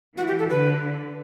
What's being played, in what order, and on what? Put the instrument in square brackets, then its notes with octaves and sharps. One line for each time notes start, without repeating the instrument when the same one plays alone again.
[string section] E3 [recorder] F#4
[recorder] G4
A4
[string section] D3 [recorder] B4